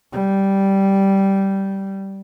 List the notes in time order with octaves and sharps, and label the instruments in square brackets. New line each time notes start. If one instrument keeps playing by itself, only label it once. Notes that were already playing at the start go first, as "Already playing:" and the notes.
[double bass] G3